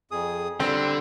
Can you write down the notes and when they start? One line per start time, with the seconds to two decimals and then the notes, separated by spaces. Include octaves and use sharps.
0.11 F2 G#4 D#6
0.60 D3 G3 C4